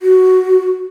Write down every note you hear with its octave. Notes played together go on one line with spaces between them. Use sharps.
F#4